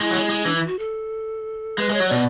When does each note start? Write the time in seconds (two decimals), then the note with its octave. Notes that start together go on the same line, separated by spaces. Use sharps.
0.01 G#3 E4
0.11 F#3
0.15 G#3
0.30 G#3
0.45 E3 D4
0.55 E4
0.67 F#4
0.79 A4
1.78 G#3 B4
1.90 G#3 C#5
2.00 F#3
2.08 B2 D5